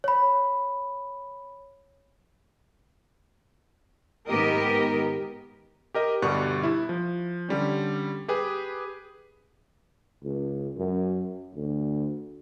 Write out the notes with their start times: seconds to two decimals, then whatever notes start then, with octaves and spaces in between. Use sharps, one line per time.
0.04 C#5 B5
4.28 G#2 D#3 B3 G4 A#4 D#5
5.94 G4 A#4 D#5
6.22 G1 B2 G3 B3 C#6 F#6
6.63 E4
6.89 F3
7.49 D3 G3 C#4
8.28 G4 G#4 B4
10.23 C#2
10.77 F#2
11.55 D2